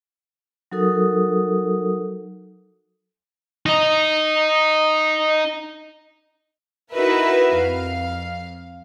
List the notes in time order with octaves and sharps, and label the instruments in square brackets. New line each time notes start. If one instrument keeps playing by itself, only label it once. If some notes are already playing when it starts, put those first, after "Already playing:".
[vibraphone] F#3 D#4 F#4 A4 A#4 D#6
[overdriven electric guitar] D#4 D#5
[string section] D#4 E4 F#4 A#4 B4 E5
F2 F5